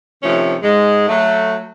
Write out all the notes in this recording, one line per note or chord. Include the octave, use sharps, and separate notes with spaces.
C3 D#3 F3 A3 C#4
G#2 G#3
F#3 A3